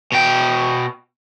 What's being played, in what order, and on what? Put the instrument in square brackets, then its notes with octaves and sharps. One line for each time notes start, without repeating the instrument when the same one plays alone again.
[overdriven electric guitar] B2 G5